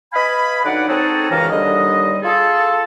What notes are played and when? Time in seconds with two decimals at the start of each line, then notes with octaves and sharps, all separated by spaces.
0.13 B4 D#5 F5 G#5 B5
0.64 D3 F#3 D#4 B4 D5 F#5
0.88 C4 C#4 D#4 F#4 G#4 A4
1.30 C#2 F#2 E3 C#4 F5 A#5
1.50 D#2 D3 G3 D#5
2.23 F4 G#4 A4